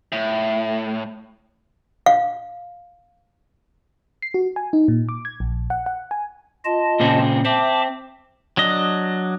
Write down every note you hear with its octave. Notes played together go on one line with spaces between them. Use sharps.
A2
F5
C7
F#4
G#5
D#4
A#2
D6
G#6
A#1
F#5
F#5
G#5
F4 D#5 A5
A#2 C#3 C4
C4 E5 A5 D6
F#3 D4 D#5